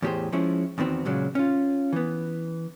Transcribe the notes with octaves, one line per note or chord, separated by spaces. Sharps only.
E2 A2 G4 G#4 C5
F3 G#3 C#4 E4
E2 D#3 B3 C4 F#4
A#2 C#3 F#3 G#3
C#4 F4
E3 B3